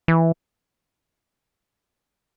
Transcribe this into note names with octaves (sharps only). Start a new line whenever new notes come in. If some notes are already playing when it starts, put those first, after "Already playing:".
E3